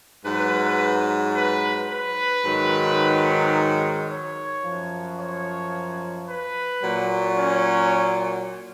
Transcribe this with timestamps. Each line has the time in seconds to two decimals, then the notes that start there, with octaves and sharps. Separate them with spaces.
0.25 G#2 F#3 B4
1.35 B4
1.89 B4
2.45 G#2 D#3 F#3
4.09 C#5
4.64 F#2 F3
5.19 C#5
6.29 B4
6.83 A#2 F#3
7.37 C#4